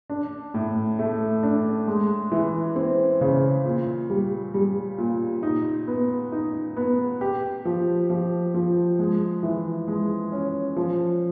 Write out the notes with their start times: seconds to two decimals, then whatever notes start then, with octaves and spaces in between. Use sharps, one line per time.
0.10 D4
0.54 A2
0.99 A3
1.43 D4
1.88 G#3
2.32 E3
2.76 C4
3.21 C#3
3.66 A#2
4.10 G3
4.54 G3
4.98 A#2
5.43 D#4
5.88 B3
6.32 D#4
6.77 B3
7.21 G4
7.65 F3
8.10 F3
8.54 F3
8.99 G#3
9.43 E3
9.88 G#3
10.32 C#4
10.76 F3